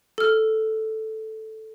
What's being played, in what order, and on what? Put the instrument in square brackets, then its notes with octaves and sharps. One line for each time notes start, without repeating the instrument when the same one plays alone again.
[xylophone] A4 F6